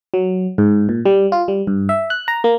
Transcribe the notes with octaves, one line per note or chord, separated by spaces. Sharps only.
F#3
G#2
A#2
G3
F4
G3
G2
E5
F#6
A#5
A#3